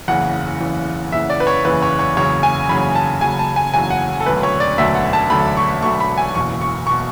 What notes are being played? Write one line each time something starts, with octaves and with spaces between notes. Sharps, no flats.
F#1 E2 C#3 E3 F#5
F#1 E2 C#3 E3
F#1 E2 C#3 E3 E5
D5
B4
C#5
F#1 E2 C#3 E3 B4
C#5
C#5
F#1 E2 C#3 F#3 C#5
G#5
F#1 E2 C#3 F#3 B5
A5
F#1 E2 C#3 F#3 G#5
A5
G#5
F#1 E2 C#3 F#3 G#5
F#5
A4
E1 D2 D3 F#3 A3 B4
C#5
D5
E1 D2 D3 F#3 A3 E5
F#5
A5
E1 D2 D3 F#3 A3 B5
C#6
E1 D2 D3 F#3 A3 C#6
B5
G#5
F#1 E2 B2 C#6
C#6
B2 C#6